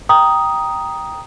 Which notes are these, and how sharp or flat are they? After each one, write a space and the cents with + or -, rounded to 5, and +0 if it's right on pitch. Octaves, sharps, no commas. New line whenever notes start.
G5 +0 A#5 +10 D#6 +0